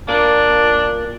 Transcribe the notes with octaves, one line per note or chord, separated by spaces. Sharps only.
A#2 D4 A#4 F5